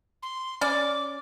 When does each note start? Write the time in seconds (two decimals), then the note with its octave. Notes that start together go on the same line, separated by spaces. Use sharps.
0.23 C6
0.61 C#4 D5 D6